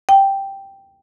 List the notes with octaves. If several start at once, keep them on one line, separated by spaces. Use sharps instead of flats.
G5